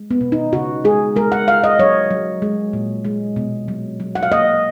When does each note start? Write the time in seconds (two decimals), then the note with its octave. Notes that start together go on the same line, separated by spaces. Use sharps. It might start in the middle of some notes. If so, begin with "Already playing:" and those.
Already playing: G#3
0.11 B3
0.21 B2
0.32 D#4
0.53 C#3 F#4
0.84 G#3 G#4
1.16 G#3 A#4
1.32 F#5
1.47 G#3 F5
1.64 D#5
1.79 F#3 C#5
2.11 F#3
2.42 G#3
2.73 A#2
3.05 G#3
3.36 B2
3.68 F#3
4.00 F#3
4.15 F#5
4.23 F5
4.31 A#3 D#5